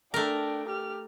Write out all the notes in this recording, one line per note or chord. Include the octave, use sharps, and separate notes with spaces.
A3 D4 A#4 G5
G4 F6